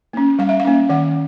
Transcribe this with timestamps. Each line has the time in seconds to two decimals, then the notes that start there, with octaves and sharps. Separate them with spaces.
0.13 A#3 C#4
0.39 G3 F5
0.49 E5
0.60 F5
0.65 A#3 C#4
0.89 D#3 F#5